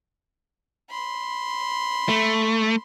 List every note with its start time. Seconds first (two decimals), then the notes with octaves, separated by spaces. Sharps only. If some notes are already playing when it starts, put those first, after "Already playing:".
0.91 B5 C6
2.09 A3